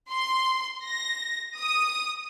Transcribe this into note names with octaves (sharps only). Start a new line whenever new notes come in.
C6
A#6
D#6